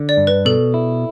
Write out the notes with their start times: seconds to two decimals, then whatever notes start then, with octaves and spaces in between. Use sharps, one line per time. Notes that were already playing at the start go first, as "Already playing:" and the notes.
Already playing: D3
0.09 D5
0.17 G2
0.27 B4
0.45 B2 A4
0.74 E4